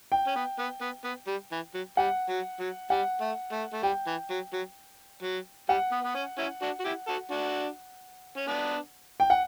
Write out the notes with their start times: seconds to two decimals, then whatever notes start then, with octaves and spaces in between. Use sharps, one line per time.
0.12 G5
0.27 C#4
0.35 B3
0.59 B3
0.81 B3
1.04 B3
1.27 G3
1.52 E3
1.74 F#3
1.97 G3 F#5
2.29 F#3
2.59 F#3
2.90 G3 F#5
3.21 A3
3.52 A3
3.73 A3
3.83 G3 G5
4.07 E3
4.30 F#3
4.53 F#3
5.22 F#3
5.69 G3 F#5
5.91 B3
6.04 B3
6.15 C#4
6.38 C#4 E4
6.62 D4 F#4
6.80 F#4
6.84 E4 G4
7.08 F#4 A4
7.31 D4 F#4
8.37 C#4
8.47 B3 D4
9.20 G5
9.30 F#5